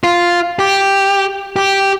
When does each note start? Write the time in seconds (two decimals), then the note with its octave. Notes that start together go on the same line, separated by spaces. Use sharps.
0.04 F4
0.59 G4
1.56 G4